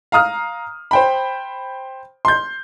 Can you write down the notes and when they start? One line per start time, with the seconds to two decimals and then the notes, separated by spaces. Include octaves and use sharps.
0.12 F5 A#5 D#6 F6
0.91 C5 G5 B5
2.25 C6 G6